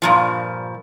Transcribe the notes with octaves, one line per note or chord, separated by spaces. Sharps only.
G2 A#2 F3